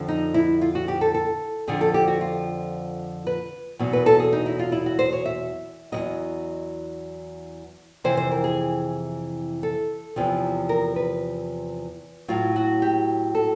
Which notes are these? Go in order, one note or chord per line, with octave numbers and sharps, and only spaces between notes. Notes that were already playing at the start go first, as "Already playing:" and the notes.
Already playing: F2 D3 F3
D#4
E4
F4
F#4
G4
A4
A4
F2 D3 F3 G#4
A4
G4
F#4
F4
B4
E2 B2 F#3
B4
A4
G#4
D#4
E4
F4
E4
F#4
C5
C#5
E5
E2 C#3 F#3 D#5
F2 C3 E3 C5
C5
A#4
G#4
A4
E2 C3 F3
A#4
B4
A2 F#3 F4
F#4
G4
A4